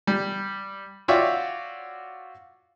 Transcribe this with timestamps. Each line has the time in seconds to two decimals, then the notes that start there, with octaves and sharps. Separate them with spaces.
0.07 G3
1.08 F4 F#4 C#5 D5 E5 G5